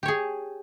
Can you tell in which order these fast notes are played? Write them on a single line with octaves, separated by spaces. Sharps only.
G4 C#5 G#4